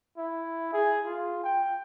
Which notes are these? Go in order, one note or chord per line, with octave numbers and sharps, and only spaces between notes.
E4
G#4
F4
G5